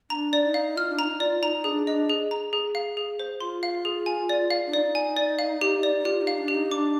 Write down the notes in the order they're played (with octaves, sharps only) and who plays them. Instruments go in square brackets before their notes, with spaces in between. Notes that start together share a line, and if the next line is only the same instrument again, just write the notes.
[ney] D4 [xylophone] A#5
[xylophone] D5
[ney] D#4
[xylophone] F5
[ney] F4 [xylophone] F6
[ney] D4
[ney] D#4 [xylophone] A#5
[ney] F4 [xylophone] D5
[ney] D#4 [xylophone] A#5
[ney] D4 [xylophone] G#4
[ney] D4 [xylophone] D#5
[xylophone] G#4
A#5
G#4
F5
G#4
C5
[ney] F4 [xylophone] C6
[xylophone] F5
G#4
G#5
D5
F5
[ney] D4
[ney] D#4 [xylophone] D5
[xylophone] G#5
D5
F5
G4
D5
[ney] D#4
[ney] F4 [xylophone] G4
[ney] D#4
[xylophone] F5
[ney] D4
[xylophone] G4
[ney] D#4
[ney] D4 [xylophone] D6